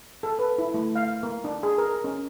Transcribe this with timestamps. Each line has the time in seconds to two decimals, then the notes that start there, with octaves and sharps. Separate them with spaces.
0.23 A4
0.39 B4
0.58 E4
0.74 A3
0.96 F5
1.23 A#3
1.44 D4
1.63 G#4
1.78 A#4
2.04 C#4